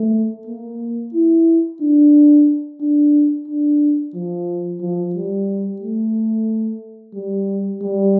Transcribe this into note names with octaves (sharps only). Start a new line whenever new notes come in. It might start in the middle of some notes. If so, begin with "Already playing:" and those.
Already playing: A3
A#3
E4
D4
D4
D4
F3
F3
G3
A3
G3
G3